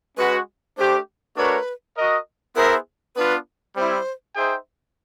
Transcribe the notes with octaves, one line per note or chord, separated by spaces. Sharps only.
G#3 C#4 F#4 B4
A3 D4 G4 C5
A3 D4 F#4 A#4 B4 C#5
F#4 A#4 D#5
B3 E4 G#4 A#4 C5 E5
B3 D4 F4 B4
G3 C4 E4 C5
D#4 G#4 C5 E5 G5